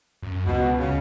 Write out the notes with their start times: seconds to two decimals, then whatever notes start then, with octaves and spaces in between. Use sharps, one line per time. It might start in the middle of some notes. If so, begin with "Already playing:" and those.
0.22 F#2
0.46 C#2 B2
0.79 C#3